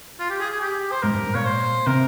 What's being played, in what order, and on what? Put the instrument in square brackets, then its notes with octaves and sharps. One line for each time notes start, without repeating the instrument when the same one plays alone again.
[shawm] F4
G4
G#4
G#4
G4
C5
[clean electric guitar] G#2 [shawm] A#4
[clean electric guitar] G2
G#2
[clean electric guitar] A#2 [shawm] C#5
[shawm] C5
[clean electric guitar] C3 [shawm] A#4